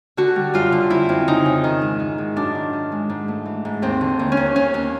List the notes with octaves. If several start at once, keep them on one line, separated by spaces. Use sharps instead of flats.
D3 F#4
G3
F#2 F4
D3
F2 E4
F2
C#3 D#4
C#3
D#3
G#2
D#3
G#2
F#2 D4
D#3
D#3
G#3
G#2
A3
E3
G#2
D#2 C4
D3
D#2
C#4
D#2
D#2 C#4
D#2